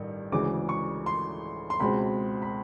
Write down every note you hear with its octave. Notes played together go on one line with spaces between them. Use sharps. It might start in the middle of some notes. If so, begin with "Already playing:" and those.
Already playing: A1 G2 D#3
D2 C#3 E3 G#3 D6
C#6
C6
C6
C#2 B2 G#3 C4 B5
B5